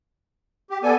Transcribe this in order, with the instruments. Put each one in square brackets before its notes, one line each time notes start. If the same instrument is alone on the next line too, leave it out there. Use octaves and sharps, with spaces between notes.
[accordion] G4
[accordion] B3 A4 G#5 [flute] D5